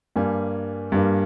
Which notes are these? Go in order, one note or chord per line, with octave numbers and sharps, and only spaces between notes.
G2 G3 A#3 G#5
G2 G3 A#3